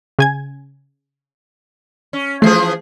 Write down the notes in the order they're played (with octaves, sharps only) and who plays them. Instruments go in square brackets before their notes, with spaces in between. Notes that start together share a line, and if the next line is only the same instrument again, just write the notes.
[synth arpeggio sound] C#3 G#5 G#6
[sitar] C#4
[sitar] E3 F3 G#4 [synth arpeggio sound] A3 C7